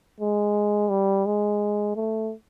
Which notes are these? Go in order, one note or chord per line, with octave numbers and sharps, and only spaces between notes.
G#3
G3
G#3
A3